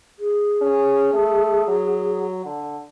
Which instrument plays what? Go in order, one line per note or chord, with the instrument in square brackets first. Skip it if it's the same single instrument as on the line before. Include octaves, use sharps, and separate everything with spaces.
[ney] G#4
[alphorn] C#4
A3
F#3
D3